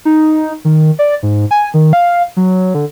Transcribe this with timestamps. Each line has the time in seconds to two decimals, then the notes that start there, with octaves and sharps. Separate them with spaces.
0.05 D#4
0.65 D#3
0.99 D5
1.23 G#2
1.51 G#5
1.74 D#3
1.93 F5
2.37 F#3
2.75 D3